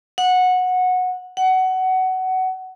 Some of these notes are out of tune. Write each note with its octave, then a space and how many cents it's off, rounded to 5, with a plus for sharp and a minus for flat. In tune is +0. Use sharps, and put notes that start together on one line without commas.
F#5 -15
F#5 +20